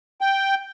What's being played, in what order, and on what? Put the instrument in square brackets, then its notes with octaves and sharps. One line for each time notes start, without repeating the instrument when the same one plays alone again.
[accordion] G5